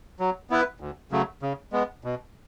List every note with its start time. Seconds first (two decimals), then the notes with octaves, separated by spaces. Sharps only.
0.19 F#3
0.50 B3 E4 B4
0.80 D2
1.11 C#3 F#3 A3
1.42 C#3
1.72 G#3 B3
2.04 B2